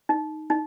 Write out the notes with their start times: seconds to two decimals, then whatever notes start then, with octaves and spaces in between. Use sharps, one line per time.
0.09 D#4
0.50 D#4